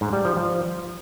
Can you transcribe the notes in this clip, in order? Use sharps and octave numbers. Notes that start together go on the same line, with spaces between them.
G#2
G3
F3
F3